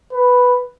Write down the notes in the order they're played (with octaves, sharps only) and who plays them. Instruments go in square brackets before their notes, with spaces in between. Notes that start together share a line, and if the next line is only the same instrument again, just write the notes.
[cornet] B4